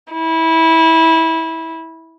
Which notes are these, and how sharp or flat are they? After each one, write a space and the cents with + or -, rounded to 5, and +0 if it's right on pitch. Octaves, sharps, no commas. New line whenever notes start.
E4 -20